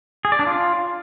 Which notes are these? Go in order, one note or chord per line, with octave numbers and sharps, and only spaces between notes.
G#4
D5
D4
F4